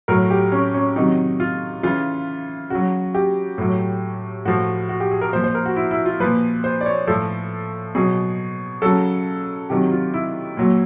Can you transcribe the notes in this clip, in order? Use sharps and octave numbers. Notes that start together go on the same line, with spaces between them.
A2 F#3 A#4
G4
C#4
C#4
C3 D#3 F#3 D#4
F4
C#3 E3 F4
C#3 F#3 F#4
G4
A2 F#3
A2 F3 F#4
F#4
G4
G#4
A#4
A#2 F3 C5
C5
A#4
F#4
E4
E4
F4
A#2 F3 B4
C5
D5
C#5
A2 F3 A4
B2 F#3 G#4
C#3 F#3 A4
C3 D#3 F#3 G4
F4
E4
A#2 F#3